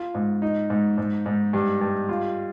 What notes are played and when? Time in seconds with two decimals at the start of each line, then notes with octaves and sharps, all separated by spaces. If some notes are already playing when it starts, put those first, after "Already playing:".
Already playing: F4
0.15 G#2
0.42 D#4
0.70 G#2
0.98 G#2
1.26 G#2
1.53 G2
1.81 G2
2.09 F4